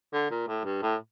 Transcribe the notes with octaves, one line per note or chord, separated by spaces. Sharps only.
D3
A#2
A2
G2
A2